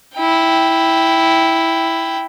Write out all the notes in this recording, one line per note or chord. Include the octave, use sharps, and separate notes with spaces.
E4 G5